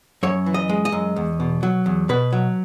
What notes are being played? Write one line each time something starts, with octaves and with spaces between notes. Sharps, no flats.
F#2 C#5
E3
D#5
G#3
D#5
F#2
E2
B2
F#3
E2
B2 B4
F#3